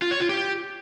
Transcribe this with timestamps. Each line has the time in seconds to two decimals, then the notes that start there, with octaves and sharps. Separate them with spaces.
0.02 F4
0.11 C#5
0.20 F4
0.29 G4